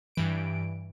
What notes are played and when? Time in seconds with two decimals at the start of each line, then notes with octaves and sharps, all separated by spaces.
0.15 G2 E3 D7